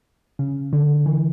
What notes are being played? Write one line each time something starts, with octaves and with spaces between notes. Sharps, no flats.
C#3
D3
E3